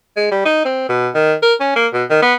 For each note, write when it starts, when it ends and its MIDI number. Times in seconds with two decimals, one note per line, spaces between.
0.17 0.28 56
0.31 0.45 55
0.46 0.65 63
0.65 0.88 60
0.89 1.10 47
1.14 1.33 51
1.43 1.54 70
1.60 1.76 61
1.76 1.87 58
1.94 2.05 47
2.10 2.21 51
2.22 2.34 59